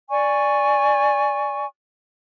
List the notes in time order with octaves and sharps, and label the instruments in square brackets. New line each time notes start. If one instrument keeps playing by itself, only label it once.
[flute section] D5 G#5 C#6